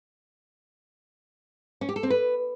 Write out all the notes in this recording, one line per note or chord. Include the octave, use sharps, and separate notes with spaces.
C#4
G4
A4
C4
B4